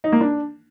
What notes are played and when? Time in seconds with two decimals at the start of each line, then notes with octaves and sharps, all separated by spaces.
0.04 D#4
0.12 A#3
0.21 D4